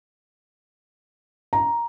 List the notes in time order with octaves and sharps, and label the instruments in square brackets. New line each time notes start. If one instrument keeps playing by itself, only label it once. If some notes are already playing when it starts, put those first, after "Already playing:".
[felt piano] A#5